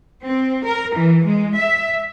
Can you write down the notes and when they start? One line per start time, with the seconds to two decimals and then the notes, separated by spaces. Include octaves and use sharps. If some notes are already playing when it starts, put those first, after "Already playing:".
0.25 C4
0.65 A#4
0.97 E3
1.26 G#3
1.57 E5